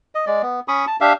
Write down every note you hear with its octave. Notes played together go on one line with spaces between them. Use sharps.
D#5
G#3 D5
B3
C#4 B5 C#6 D#6
A5
D4 G4 E5 F5